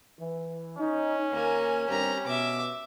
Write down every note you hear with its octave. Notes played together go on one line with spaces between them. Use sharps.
E3
C#4 D#4
D#2 A#3 A#4 G#5
G2 C4 G4 A#4 A#5
B2 E5 D6